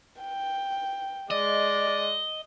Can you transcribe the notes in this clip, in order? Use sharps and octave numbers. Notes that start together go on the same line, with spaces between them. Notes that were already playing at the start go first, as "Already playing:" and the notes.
G5
G#3 D5 D#5